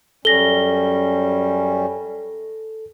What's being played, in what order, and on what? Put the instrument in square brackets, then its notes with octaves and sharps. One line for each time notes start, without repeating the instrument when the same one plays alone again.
[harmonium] F#2 G3 C#4 [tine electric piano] A4 [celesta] A#6 G7